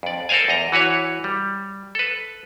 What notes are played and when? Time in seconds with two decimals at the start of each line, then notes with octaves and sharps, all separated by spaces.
0.03 F2 D5
0.29 A4 A#4 C5 D5 F5 G#5
0.48 E2 D#5 A#5
0.72 E3 F#4 B4 C#5
1.24 G3
1.95 A4 B4